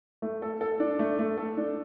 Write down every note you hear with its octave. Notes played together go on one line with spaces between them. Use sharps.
A3
A4
A4
D4
A3
A3
A4
D4